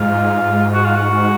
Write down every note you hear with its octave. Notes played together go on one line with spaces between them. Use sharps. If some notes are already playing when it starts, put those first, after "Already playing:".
Already playing: G#2 F4
F#4
F4
F#4